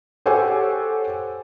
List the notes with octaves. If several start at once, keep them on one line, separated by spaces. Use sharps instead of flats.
G4 A4 C5 C#5 F#5 G#5